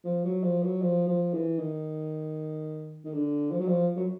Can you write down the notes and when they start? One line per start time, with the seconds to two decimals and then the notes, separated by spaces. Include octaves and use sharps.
0.05 F3
0.25 F#3
0.43 F3
0.63 F#3
0.82 F3
1.08 F3
1.34 E3
1.59 D#3
3.05 D#3
3.14 D3
3.52 F3
3.61 F#3
3.68 F3
3.97 F#3